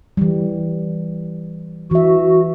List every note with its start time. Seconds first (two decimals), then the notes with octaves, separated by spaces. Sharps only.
0.17 E3 G3
1.91 E3 F#4 E5